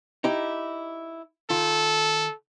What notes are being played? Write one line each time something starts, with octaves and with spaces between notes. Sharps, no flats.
D#4 E4 G4
D#3 F4 A4